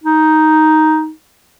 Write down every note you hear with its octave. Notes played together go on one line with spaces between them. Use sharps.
D#4